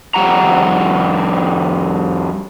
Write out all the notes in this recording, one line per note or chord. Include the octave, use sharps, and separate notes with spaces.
F2 G3 F#5 A#5